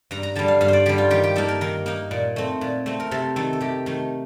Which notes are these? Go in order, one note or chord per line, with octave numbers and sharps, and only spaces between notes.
G2 A#5
A#5
D3 G3 A5
F5
G2 F5
C5 D5
D3 G3 G4
F4
D#3 G4
G4
A#3 D#4 A4
A#4
D#3 A#4
A#3 D#4
A#2
A3 C4
A#2
A3 C4
A#4
C3 A4
D#3 A3 A4
A4
C3 G4
D#3 A3